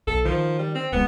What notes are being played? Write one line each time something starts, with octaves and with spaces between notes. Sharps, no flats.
B1 A4
D#3 F3
G3
C4
D1 G#3 B3